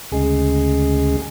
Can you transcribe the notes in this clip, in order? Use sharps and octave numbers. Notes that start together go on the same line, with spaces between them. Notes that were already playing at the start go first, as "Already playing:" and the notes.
D2 C#3 G#3 G#4